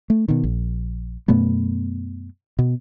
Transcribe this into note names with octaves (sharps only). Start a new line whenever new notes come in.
A3
B2 D#3
A#1
F#2 B2 A3 B3
B2